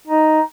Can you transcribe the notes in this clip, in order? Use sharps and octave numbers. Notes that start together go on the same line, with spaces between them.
D#4